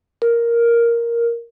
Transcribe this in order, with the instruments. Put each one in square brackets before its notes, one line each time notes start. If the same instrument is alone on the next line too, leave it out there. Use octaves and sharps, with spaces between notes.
[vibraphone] A#4